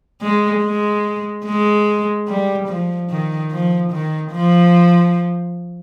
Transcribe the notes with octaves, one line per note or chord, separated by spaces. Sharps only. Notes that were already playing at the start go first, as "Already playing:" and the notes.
G#3
G#3
G#3
G3
F3
D#3
F3
D#3
F3